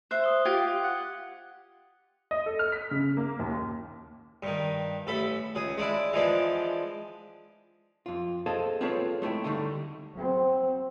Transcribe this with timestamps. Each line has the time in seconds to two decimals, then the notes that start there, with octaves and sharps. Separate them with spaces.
0.11 C5 E5 F#6
0.24 D#6 G7
0.45 F4 G4 G#6
0.83 F#5
2.31 D#5
2.46 A4
2.59 F6
2.72 B6
2.91 C#3
3.17 A#3
3.39 D#2
4.43 G2 D#3
5.07 A1 A4 B5
5.55 C#2 G#4
5.78 G#3 D4 E4
6.13 E3 F3 G#3 D4
8.06 F2 F4
8.46 G#4 A4 C5 D#5 F5 A5
8.81 C4 F4 G#4 A4 B4 C#5
9.22 G#3 A3 E4 G5
9.44 D2 D3 G3 A3 D#4
10.16 F#3 C4